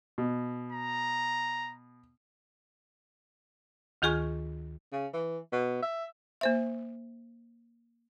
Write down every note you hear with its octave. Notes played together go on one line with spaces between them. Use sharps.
B2
A#5
D2 D#3 F4 G#4 G#5 C#6
C#3
E3
B2
E5
A#3 C5 E5